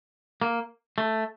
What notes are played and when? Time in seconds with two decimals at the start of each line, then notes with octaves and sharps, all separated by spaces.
0.42 A#3
0.98 A3